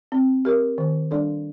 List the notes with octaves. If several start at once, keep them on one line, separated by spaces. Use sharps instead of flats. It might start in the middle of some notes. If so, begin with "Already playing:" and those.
C4
G4 A#4
D#3
G3 D4 A4 D5